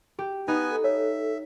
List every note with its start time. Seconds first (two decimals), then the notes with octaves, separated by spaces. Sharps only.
0.19 G4
0.48 B3 D#4 B4 G#5
0.71 A4
0.84 C#5 E5